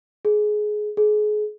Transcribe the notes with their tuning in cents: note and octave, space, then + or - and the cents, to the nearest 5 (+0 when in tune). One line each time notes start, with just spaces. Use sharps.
G#4 +20
G#4 +30